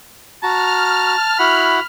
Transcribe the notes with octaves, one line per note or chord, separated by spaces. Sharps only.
F#4 A5 A#5 F6
E4 F#4 F#5 B5